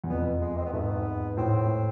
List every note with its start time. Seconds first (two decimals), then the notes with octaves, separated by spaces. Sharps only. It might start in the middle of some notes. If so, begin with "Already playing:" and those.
0.04 E2
0.09 F2 B3
0.42 G#3
0.58 C4
0.66 B3
0.73 G#2 A3
0.81 B3
1.37 A2 C4